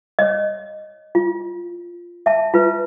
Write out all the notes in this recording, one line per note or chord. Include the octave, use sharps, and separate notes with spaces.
C#5 D#5
F4
E5 A5
F4 B4